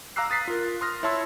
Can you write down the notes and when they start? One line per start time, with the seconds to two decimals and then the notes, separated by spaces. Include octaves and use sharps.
0.16 F5 A#5 D6 E6 F#6 C7
0.30 D#6 A6 B6 C7
0.48 F4 A#4
0.81 C6 D#6 F6 A#6
1.03 E4 C#5 E5 A5 C6 E6